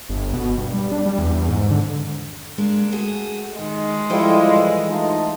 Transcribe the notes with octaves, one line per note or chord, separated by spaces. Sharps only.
G1
B2
G2
G3
D4
G3
E2
E2
G#2
D3
G#3 A#3 D4
A3 F#4 G#4
D#3 G#3
F3 G3 E4 F4 A4 G5
E3
A3 D#4 F4